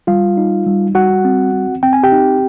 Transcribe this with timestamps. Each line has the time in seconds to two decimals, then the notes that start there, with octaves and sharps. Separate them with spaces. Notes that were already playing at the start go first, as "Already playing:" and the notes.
0.07 G3 F4 F5
0.37 D#4
0.66 G3
0.95 G3 F#4 F#5
1.25 C4
1.53 C4
1.83 C4 G5
1.93 G#5
2.03 G4 G5
2.12 D#4